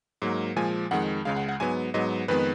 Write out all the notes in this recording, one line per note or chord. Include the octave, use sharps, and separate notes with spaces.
G#2 F#3 A#3
A#2 F3 G#3 G#5
F2 D#3 G#3 F#5
C#2 C#3 G#3 F5
F#5
F#5
G#2 F#3 B3 G#5
G#2 F#3 B3 D#5
F2 D#3 G#3 B3 B4